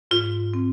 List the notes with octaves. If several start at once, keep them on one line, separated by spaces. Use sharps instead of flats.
G#2 F4
C4